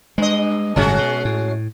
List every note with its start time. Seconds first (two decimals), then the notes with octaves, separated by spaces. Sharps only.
0.18 G2 G#3 D#5
0.76 G1 A2 C3 G#3 C#4 F#4
0.99 B2
1.25 A2